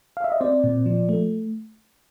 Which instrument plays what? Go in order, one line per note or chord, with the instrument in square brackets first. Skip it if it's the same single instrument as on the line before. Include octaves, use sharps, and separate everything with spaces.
[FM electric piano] F5
E5
D#5
C4 C5 D5
A#2
F3
A3